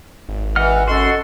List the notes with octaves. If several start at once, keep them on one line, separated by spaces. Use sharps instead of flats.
G#1
G#1 E3 D#5 F#5 F6
F#2 F#4 A4 D#5 C6